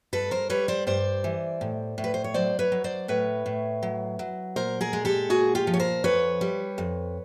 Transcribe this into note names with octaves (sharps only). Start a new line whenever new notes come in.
G2 A4 B4
A#4 C5
G3 B4 C#5
C5 D5
G2 C5 D5
E3
A2
A2
B4
C5
C#5
F#3 C5 D5
B4 C#5
F#3
C5 D5
A2 B4 C#5
A2
F#3
F#3
A#2 A#4 C5
G#4 A#4
G#3
G4 A4
A#2 F#4 G#4
F4 G4
F3
C#5
A#4 C5
F2 B4 C#5
G3
F2